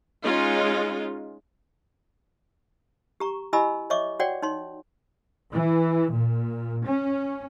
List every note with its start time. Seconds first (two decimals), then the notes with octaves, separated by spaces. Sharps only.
0.23 G#3 C#4 D#4 F4
3.20 G4 A#5 C#6
3.53 E4 G4 D#5 G#5 B5 E6
3.90 C#5 D#5 E5 C#6 D6
4.20 F#4 C#5 D5 F#5 G5
4.42 D#4 C#5 C6
5.54 E3
6.14 A#2
6.87 C#4